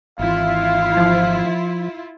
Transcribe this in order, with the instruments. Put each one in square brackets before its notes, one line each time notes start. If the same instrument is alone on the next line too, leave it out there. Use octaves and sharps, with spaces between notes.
[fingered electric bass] G#1 E3 [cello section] E4 F4 [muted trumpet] F5
[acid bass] F3